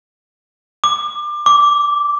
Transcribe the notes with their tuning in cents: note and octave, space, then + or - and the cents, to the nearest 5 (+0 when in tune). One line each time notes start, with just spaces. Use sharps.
D6 +25
D6 -10